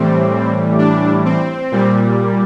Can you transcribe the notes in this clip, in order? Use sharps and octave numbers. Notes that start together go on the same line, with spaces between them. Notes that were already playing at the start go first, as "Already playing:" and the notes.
Already playing: A2 E3 G3 C4
D4
C4
A#2 G3